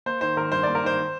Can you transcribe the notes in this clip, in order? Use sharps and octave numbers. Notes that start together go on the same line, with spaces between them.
A#3 C5
D#3 C5
G#1 A#4
G2 C5
D5
A#3
A#4
D#3 C5